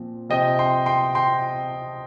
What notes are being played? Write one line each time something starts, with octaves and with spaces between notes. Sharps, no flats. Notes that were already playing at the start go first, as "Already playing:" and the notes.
Already playing: A#2 F3 C4
C3 F3 C4 D#5 G5
G5 C6
G5 C6
G5 C6